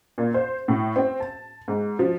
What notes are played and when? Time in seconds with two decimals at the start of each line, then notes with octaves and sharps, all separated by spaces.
0.18 A#2
0.34 C5
0.68 A2
0.96 C4
1.20 A5
1.68 G#2
1.99 F3